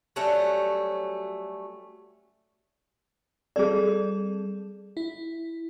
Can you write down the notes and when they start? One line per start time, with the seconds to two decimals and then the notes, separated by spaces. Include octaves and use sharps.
0.16 F#3 G3 A3 C#4
3.56 G3 C4 G#4 A4 D5
4.97 E4